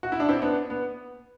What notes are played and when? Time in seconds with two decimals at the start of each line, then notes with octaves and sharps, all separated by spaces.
0.03 F#4
0.12 E4
0.20 D4
0.29 C4 E4
0.42 B3 D4
0.70 B3